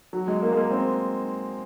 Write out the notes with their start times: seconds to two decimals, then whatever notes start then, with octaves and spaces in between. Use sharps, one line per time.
0.13 F#3
0.28 G#3
0.42 A#3
0.52 G#3
0.57 A#3
0.71 C4